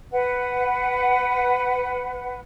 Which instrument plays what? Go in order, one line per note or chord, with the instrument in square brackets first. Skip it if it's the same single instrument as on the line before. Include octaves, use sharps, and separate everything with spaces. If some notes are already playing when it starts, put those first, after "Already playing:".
[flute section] B4 F#5